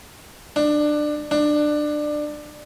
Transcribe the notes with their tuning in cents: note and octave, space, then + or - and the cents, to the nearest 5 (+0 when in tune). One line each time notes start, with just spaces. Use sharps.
D4 +20
D4 +20